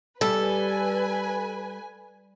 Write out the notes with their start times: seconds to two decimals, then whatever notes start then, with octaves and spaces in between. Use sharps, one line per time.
0.21 G3 A4 B4 G#5